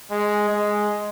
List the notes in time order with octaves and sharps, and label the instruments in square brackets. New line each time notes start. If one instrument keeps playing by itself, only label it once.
[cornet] G#3
G#3